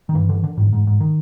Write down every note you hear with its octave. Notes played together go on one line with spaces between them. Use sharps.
D#3
G2 E3
D3
D3
G#2
G#2
G#2
D#3